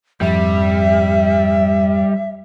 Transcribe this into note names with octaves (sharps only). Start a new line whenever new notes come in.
F2 G#2 F3 G3 E5